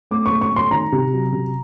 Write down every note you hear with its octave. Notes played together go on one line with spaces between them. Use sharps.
A3 D6
C#6
A3
C#6
A3 C6
D#3 A#5
C3
F#3
C3